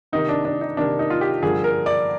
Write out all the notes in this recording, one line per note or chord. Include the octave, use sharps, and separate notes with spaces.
C3 D#3 A#3 D#4
D4
D4
D#4
C3 D#3 A#3 D4
D#4
F4
G4
G2 D3 F3 A#3 G#4
A#4
D5